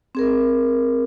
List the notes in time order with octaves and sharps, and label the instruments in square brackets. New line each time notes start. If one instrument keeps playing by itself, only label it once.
[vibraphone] C4 G#4 A#4